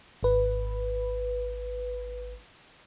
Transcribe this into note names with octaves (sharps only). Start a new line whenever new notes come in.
G#1 B4